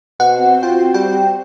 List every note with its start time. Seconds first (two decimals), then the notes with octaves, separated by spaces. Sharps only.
0.20 B2 C4 F#4 C5 F#5
0.63 F4 G5
0.94 G3 G5